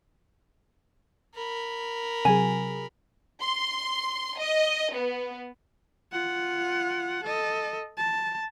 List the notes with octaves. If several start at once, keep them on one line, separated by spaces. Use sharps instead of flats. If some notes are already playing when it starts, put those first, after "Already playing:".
A#4 B5
C3 F#3 G#4 G#5
C6
D#5
B3
F4 F#5
A4 D#5
A5